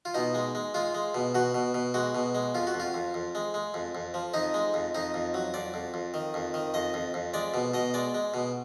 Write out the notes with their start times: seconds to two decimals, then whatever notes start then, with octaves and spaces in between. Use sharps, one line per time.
0.05 F4
0.14 B2 D#4
0.34 G#3
0.55 G#3
0.74 G#3 F4
0.94 G#3
1.15 B2
1.35 B2 F#4
1.55 B2
1.74 B2
1.94 G#3 F#4
2.15 B2
2.35 G#3
2.55 F2 F4
2.67 F#4
2.74 F2
2.80 F4
2.94 F2
3.14 F2
3.35 G#3
3.54 G#3
3.74 F2
3.95 F2
4.14 F3
4.34 F2 D#4
4.54 G#3
4.74 F2
4.95 F2 D#4
5.14 F2
5.34 F#3
5.54 F2 D5
5.74 F2
5.94 F2
6.14 D#3
6.34 F2
6.54 D#3
6.74 F2 D#5
6.94 F2
7.14 F2
7.34 G#3 D5
7.54 B2
7.74 B2 D#5
7.94 G#3 D5
8.14 G#3
8.34 B2